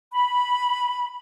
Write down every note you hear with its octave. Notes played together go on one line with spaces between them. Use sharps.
B5